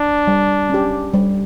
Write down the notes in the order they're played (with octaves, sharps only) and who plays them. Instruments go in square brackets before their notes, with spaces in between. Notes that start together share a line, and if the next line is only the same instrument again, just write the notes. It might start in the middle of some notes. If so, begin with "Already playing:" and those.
Already playing: [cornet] D4
[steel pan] G3
C#4 G4
G3